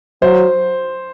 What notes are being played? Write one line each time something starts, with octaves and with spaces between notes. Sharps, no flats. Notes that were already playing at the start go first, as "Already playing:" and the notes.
F#3 C5